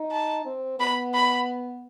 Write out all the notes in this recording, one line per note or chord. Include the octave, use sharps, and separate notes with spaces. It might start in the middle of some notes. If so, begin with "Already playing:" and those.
Already playing: D#4
A5
C4
B3 B5
B5